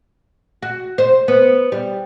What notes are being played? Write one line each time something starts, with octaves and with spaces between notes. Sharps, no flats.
F#4
C5
B3
G3